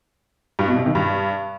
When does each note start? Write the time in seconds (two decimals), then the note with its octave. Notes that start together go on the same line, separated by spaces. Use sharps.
0.59 G2
0.68 B2
0.77 C3
0.86 D#3
0.95 G2